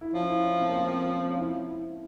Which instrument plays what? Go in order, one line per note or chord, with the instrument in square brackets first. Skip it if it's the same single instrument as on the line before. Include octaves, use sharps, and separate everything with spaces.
[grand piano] E4
[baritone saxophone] F3 [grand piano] C#4
[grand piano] E4
C#4
C4
A#3
C4
C4
C#4
C4
C#4
E4
E4